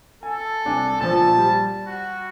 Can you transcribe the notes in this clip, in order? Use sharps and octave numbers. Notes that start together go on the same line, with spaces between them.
A4 G#5
C2 D4 G#5
A#2 F3 A5
G3
F#4